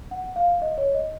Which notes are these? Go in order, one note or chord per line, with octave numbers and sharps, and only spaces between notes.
F#5
F5
D#5
C#5
D#5